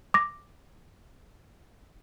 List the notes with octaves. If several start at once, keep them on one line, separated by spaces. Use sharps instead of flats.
D6 A#6